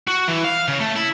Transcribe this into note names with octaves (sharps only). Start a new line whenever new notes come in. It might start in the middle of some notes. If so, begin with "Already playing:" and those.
F#4
E3
F5
C#3
A3
E4